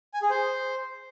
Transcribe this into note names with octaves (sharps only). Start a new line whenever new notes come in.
G#5
G#4
C5